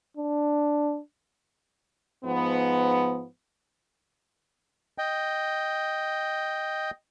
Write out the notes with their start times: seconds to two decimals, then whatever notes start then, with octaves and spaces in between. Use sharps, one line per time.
0.17 D4
2.24 G#2 F3 B3
4.98 D#5 G5